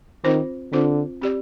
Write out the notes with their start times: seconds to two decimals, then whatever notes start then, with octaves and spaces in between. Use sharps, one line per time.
0.24 D#3 C4 F4 C5
0.72 D3 C4 F4 C5
1.21 C4 G4 D5